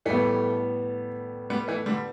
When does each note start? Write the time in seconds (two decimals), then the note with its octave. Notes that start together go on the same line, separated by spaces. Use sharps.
0.06 A2 E3 G3 A3 B3
1.50 G3 B3
1.68 E3 A3
1.86 D3 G3